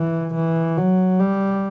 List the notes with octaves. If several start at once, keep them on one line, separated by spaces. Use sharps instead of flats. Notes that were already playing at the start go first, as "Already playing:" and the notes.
Already playing: E3
E3
F#3
G3